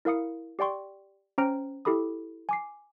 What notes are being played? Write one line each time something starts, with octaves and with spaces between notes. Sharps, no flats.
E4 A#4 F5 D#6 C#7
G4 D5 G5 C6 C#6
C#4 C5 G5 A#5 F6 D7
E4 G4 A4 B5 D#6
G#5 D6 C7